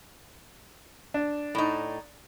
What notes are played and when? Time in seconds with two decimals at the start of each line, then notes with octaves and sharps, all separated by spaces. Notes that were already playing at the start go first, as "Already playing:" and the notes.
1.14 D4
1.55 A2 D#4